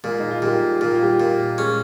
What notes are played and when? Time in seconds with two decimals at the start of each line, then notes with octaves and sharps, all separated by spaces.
0.04 A#2 G#3 G#4
0.20 D#4
0.31 F4
0.42 A#2 G3 G4
0.81 A#2 G4
0.91 F4
1.03 G3 G4
1.20 A#2
1.58 G#3 C#4 G#4